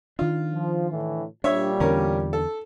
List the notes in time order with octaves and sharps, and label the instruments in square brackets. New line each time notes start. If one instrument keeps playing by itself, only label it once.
[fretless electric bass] D#3 D4 [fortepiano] F4
[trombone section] F3
A2 D3 E3
[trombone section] A#2 G3 [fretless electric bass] D4 [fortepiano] C#5 E5
[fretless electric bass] E2 D3 [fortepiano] C#4 A#4
[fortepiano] A4